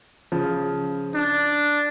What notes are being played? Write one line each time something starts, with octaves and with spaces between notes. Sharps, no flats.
C#3 F3
D4